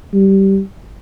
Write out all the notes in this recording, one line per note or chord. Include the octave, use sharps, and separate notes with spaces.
G3